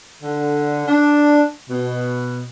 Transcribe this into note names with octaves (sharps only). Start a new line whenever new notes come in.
D3
D4
B2